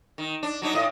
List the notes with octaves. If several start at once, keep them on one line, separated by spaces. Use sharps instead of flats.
D#3
D4
F#3 D4 D#4
A2 D#5